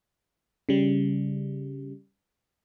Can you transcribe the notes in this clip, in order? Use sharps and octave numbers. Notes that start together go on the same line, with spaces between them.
C#3 G3